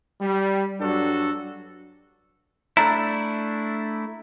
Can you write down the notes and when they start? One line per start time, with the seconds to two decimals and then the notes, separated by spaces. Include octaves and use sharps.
0.21 G3
0.81 G2 F#3 D4 F#4 A4
2.77 A3 D4 E4 A#5